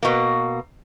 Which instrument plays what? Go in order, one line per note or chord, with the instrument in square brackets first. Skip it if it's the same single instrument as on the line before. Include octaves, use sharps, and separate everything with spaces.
[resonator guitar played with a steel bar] B2 A#3